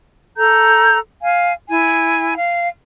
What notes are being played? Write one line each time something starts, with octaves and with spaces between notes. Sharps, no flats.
A4 A#5 G6
F5 G#5
E4 G#5
F5